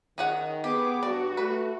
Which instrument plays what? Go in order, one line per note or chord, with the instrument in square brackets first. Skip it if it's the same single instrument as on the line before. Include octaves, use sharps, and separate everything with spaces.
[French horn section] D#3 [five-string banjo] C#4 G#4 F#5
[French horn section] B3 [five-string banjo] G4 [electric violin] G#4 D6
[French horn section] G2 [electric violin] F#4 [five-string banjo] D5
[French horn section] A3 [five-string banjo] B4